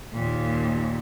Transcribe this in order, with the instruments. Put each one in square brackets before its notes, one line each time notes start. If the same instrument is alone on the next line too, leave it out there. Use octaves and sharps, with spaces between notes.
[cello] D#2 A#2